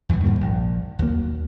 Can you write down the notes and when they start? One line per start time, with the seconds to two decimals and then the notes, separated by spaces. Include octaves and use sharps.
0.09 E2 G2 A#2 E3
0.23 G#2 D#3 G3 A#3
0.41 A#1
0.99 D#2 F#3 A#3